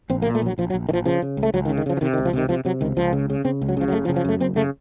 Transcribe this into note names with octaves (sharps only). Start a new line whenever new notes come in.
A#1 C4
A#3
A#2
A3
A#1 F#3
A#1 F3
F#3
A#1
A#1 D#3 F3
C#3 F3
C#3
C#2
A3
C#2 F#3
D#3
C#3
D#3
C#3 F3
F3
C3 D#3
D#3
C#2
F3
C3 D#3
C3 F3
C3 F#3
C#2 D#3
C#2 F3
C#3
C#3
C#3 C4
C#2
F#3
C#3 F3
F#3
F#1 A3
F3
C#3
F3
F#2 A3
F#1 C4
C#3 A3